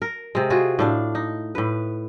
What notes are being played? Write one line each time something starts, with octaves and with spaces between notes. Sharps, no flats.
A#4
C3 G#3
F4 F#4 G#4
A2 D4 F5
D#4
A2 B4